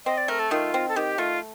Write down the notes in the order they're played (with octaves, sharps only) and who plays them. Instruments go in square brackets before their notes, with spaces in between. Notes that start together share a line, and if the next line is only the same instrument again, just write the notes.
[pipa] C4 [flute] D#5
[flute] D5
[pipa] A3 [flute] A#4
[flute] A4
[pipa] D#3 [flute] F4
[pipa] C4
[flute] A4
[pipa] D#3 [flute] G4
[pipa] A3 [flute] F4